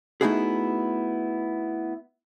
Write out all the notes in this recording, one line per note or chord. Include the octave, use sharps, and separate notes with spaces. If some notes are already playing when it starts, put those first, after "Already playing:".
A3 B3 D#4 E4 F#4 G#4